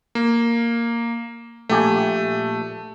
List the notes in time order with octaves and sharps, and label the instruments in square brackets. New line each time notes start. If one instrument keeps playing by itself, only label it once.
[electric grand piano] A#3
[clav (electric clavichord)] A#1 G4 G#5 [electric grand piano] A3